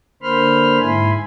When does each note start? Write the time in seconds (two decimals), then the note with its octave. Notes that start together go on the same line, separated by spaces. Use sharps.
0.23 D3 A#3 C5 B5 C6 F6
0.80 G#2 E4 G#5 B5 C6